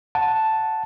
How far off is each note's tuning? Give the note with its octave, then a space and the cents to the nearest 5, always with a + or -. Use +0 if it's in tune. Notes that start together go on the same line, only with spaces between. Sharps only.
F#5 -5 A5 +0